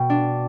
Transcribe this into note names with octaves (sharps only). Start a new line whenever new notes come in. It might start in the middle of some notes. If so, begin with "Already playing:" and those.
Already playing: B2 G5
D4